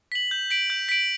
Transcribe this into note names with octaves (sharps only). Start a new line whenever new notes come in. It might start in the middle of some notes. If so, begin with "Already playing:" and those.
B6 F#7
G6
B6 D7 F#7
G6
B6 D7 F#7